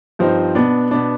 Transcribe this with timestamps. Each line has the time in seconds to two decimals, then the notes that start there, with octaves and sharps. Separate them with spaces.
0.19 G2 F3 C4 D#4
0.55 B2 B3 D4
0.91 B2 B3 D4